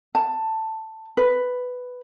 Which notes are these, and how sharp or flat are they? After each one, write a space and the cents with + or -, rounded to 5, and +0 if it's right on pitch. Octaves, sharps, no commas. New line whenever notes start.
A5 +10
B4 +5